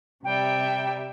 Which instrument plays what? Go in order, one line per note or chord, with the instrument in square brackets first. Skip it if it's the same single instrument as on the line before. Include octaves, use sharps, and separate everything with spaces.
[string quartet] C3 G3 E5 [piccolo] G5